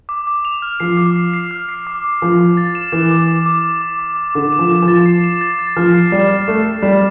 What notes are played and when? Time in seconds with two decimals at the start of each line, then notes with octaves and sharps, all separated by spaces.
0.09 D6
0.27 D6
0.45 F7
0.62 F6
0.80 F3 C7
0.97 D6
1.16 C7
1.34 C7
1.51 F6
1.69 C7
1.87 D6
2.04 D6
2.22 F3 D6
2.40 D6
2.57 A6
2.75 E7
2.92 E3 E7
3.11 D6
3.28 D6
3.46 D6
3.64 D6
3.82 D6
4.00 D6
4.17 D6
4.35 D3 D6
4.53 E7
4.59 F3
4.71 D6
4.82 F3
4.88 A6
5.06 C7
5.24 E7
5.41 A6
5.59 A6
5.77 F3 F6
5.94 C7
6.12 G3 E7
6.30 A6
6.48 A3 E7
6.65 C7
6.82 G3 E7